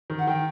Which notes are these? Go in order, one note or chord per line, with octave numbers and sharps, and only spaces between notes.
D#3
F#5
D#3 G5